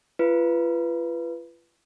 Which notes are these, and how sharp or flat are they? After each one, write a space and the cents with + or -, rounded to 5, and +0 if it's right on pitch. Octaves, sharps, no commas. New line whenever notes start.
F4 -35 B4 +0